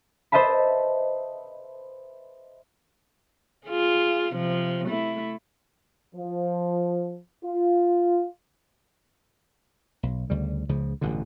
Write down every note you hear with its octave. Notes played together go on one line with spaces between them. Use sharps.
B4 C5 D#5 E5 A5 B5
F4 G#4
C3 F3
A3 E4
F3
F4
B1
D2 C#3 G3
C#2 C#3 F3
A1 G2 B2 D3